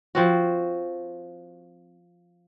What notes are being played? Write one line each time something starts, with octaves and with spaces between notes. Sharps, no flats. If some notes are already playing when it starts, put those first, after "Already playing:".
F3 C4 F#4